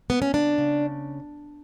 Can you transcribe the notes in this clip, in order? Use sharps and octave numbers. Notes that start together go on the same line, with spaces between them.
B3
C#4
C#3 D4
C#3